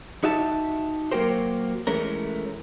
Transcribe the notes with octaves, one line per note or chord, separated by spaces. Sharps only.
D#4 F#4 G4 E5 A5
F#3 A#3 F#4 G4 A#4 C5
E3 G#3 A3 C#4 A#4